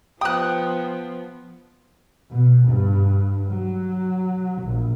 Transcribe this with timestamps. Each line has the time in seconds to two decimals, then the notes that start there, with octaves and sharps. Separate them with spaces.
0.21 F3 B3 G5 D#6 F#6
2.30 B2
2.69 G2
3.47 F#3
4.62 A#1